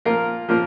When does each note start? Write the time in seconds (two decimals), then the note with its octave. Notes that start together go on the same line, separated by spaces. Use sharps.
0.05 F3 A#3 F4 A#4
0.48 F3 A#3 F4 A#4